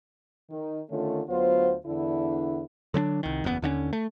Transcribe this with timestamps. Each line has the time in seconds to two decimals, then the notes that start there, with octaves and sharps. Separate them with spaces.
0.50 D#3
0.90 D3 D#3 A3 C#4 F4 C#5
1.29 D2 F#3 B3 F4 C5
1.86 E2 D3 D4 E4
2.94 D3 F#3 C#4 D4
3.23 C2 D#3
3.44 F#1 E2 G2 B3
3.62 D#2 D3 A#3 C#4
3.93 A3